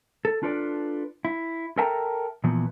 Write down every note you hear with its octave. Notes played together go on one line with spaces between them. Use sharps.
A4
D4 F4 A4 B4 D5
E4
A4 A#4 E5 G5 A5 A#5
A#2 E3 F3 B3